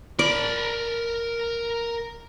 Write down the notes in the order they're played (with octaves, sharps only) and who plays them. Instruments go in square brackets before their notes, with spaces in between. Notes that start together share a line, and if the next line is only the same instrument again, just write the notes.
[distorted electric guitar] A#4 B5 [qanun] D5